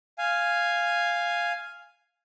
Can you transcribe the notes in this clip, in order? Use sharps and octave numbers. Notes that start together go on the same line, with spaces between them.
F5 G#5